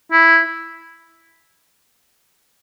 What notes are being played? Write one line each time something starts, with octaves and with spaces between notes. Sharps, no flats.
E4